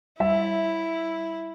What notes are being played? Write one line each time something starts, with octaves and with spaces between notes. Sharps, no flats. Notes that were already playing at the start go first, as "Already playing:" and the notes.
G3 E4 E5